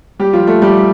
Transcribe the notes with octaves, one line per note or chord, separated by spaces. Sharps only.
G3 G4
F3 F4
A3 A4
G3 G4